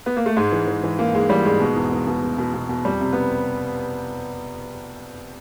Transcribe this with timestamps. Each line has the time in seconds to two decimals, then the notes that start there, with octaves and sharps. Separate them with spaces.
0.06 B3
0.16 A#3
0.26 A3
0.37 G#2 G#3
0.52 E3
0.68 E3
0.83 E3
0.99 E3 A#3
1.14 G#2 G#3
1.29 E3 G3
1.45 G#2 G#3
1.60 B2
1.76 E2
1.92 E2
2.07 B2
2.23 B2
2.38 B2
2.54 B2
2.69 B2
2.85 F2 G3
3.01 C3
3.13 B3